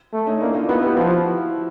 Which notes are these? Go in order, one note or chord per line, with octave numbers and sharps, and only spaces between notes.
A3
C#4 D#4
A#3 D4 E4
D#4 F4
B3 E4 F#4
F4 G4
F3 E4 F#4